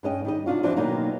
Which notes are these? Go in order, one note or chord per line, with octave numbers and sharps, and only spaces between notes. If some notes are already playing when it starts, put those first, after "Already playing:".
G2 C#4 D#5 G5
D#3 G3 D#5
C3 D4 F4 F#4
E3 F3 B3 D4 F#4
B2 D#3 F#3 A#3 B3 D#4